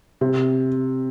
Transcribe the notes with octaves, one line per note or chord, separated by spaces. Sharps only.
C3